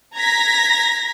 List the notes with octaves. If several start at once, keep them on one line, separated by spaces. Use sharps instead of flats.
A#5 G#6 A#6 B6